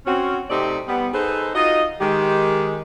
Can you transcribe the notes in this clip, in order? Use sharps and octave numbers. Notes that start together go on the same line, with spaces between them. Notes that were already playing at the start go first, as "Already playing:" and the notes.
C4 C#4 F#4
C3 A3 C4 D#4 G4 D5
G3 B3
D#4 G#4 A4 B4 C5
D#4 F4 F#4 D#5
D#3 G#3 G4